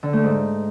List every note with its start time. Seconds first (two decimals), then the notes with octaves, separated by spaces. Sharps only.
0.03 D3
0.13 A3
0.24 G#2